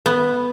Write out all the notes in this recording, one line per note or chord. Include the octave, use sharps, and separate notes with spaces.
B3